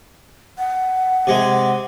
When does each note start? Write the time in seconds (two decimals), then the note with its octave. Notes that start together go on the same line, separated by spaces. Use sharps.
0.58 F#5
1.27 C3 G#3